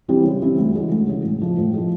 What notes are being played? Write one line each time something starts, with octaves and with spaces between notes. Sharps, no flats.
E3 G3 C4 E4
C#3
E3 G3 C4 E4
D2
C#3 E3 G#3
D2
C#3 E3 G#3
A2
F3 G#3
A2
F3 G#3